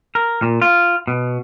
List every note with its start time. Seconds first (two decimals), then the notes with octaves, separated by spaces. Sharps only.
0.15 A#4
0.42 A#2
0.62 F4
1.08 B2